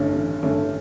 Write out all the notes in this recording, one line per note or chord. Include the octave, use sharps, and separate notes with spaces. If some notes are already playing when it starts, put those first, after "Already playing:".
Already playing: A1 G2 D3 A3 C#4
A1
G2 D3 A3 C#4